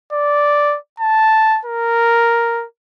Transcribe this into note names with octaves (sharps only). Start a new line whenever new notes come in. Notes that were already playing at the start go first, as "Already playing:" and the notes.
D5
A5
A#4